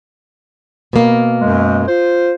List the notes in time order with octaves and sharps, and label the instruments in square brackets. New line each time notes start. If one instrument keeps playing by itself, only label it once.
[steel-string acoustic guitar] B2 A#3
[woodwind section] F#2 G#3
F4 C5